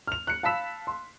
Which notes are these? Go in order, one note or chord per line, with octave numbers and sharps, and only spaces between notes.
F6 F7
F#6 C#7
F5 A5 B5 E6 B6 E7
C6